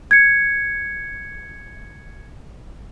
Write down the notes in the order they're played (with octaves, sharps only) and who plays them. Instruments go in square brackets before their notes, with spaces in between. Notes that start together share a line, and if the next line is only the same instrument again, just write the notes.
[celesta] G#6 C#7